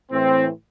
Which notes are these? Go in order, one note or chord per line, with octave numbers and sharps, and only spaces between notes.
A2 E3 C4